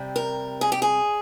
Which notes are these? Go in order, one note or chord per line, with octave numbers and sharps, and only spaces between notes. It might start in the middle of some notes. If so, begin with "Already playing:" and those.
Already playing: C3 G3
A#4
G#4
G4
G#4